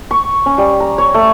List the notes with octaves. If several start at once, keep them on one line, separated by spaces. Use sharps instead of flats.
C#6
C#4
G3
A#5
C#5
A3